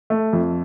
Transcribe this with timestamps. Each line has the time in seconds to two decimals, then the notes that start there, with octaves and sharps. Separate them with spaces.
0.10 A3
0.33 F2